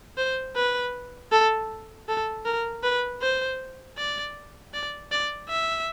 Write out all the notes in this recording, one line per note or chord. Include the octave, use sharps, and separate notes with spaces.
C5
B4
A4
A4
A#4
B4
C5
D5
D5
D5
E5